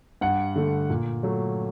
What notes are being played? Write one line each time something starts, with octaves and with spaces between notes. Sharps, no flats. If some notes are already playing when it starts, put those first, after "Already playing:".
G2 F#5
D3 A3
A#2
F#3 A3